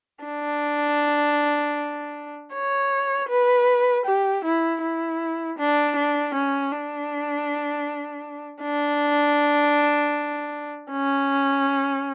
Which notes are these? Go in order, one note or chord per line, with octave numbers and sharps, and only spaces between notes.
D4
C#5
B4
G4
E4
E4
D4
D4
C#4
D4
D4
C#4